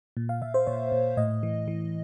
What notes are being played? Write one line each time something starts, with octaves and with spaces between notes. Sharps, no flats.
A#2
F5
A#2 E5
C5
A#2 C#5
A#2
A2 D#5
E3
E3